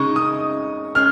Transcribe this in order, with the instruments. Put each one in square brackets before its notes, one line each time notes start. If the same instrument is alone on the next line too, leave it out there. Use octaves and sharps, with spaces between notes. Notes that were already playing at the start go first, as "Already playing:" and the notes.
Already playing: [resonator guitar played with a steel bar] C#3 G#3 D#4 [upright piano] C#6
[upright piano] D#6
[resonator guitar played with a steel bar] G#3 C#4 [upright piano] F6